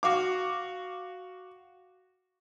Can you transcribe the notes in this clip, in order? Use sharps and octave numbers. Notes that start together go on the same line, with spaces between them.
F#4 F5 D6